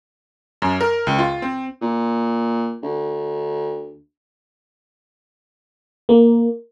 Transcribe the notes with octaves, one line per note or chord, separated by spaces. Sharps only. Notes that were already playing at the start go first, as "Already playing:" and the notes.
F#2
A#4
C#2
F4
C4
A#2
D2
A#3